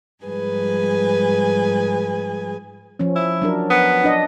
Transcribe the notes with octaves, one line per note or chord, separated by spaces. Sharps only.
G#2 F3 G3 G#4 B4 G#5
F3 C#4
E4
F#3 D4 A#4
B3
D4 D#5